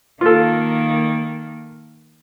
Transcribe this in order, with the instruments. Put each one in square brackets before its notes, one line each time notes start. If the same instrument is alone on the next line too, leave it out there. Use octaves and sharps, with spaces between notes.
[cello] D#3 A#3 [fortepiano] F4 A4